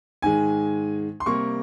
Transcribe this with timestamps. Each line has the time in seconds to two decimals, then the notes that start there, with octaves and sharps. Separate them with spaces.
0.22 G#2 D#3 G#3 G#5
1.20 C6
1.26 C3 G3 A#3 C#6